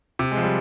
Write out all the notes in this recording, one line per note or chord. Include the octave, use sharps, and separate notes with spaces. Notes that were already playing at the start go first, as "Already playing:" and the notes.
C3
G#3
F3
G3